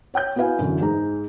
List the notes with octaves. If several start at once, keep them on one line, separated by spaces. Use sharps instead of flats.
C#5 G5 F#6 G6
B3 E4 F#4 B4 F5 G#5
F#2 D3 E3
G#2 G#3 A#5